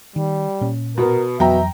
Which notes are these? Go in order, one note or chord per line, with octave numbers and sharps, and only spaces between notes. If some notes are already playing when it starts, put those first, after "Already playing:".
D#3 G3
A#2 C#4
B2 B3 A#4
F2 B2 E3 F#3 E5 G5 A#5